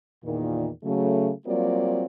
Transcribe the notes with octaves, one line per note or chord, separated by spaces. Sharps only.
E2 A#2 D#3
C#3 F#3 A3
F#3 G3 A#3 C4 F4 D5